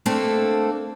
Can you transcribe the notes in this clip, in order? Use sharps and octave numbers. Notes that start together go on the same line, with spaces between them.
A3 A#3 C4 D4 A4